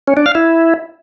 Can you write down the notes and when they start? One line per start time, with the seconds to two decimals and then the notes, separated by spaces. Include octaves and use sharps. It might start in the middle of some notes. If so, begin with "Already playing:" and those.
0.08 C#4
0.17 D4
0.26 F5
0.35 E4